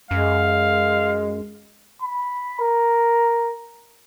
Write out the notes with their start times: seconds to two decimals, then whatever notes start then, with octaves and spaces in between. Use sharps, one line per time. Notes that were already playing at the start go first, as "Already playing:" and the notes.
0.11 F#2 G#3 F5
2.02 B5
2.61 A#4